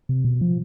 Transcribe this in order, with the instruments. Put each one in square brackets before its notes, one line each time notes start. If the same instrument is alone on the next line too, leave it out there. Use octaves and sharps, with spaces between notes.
[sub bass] C3
B2
F3